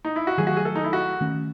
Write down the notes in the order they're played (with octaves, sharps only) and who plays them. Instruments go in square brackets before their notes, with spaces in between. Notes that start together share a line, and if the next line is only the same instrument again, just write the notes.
[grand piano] D#4
E4
F#4
[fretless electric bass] D#3 F#3 A3 [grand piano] G#4
[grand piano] F#4
G#4
A4
D#4
E4
F#4
[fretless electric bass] D#3 A3 C#4